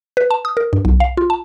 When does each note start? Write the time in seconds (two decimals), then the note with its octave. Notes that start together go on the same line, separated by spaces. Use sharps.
0.17 B4
0.31 A5
0.45 D#6
0.57 A#4
0.73 G2
0.85 B1
1.00 F5
1.17 F4
1.30 A5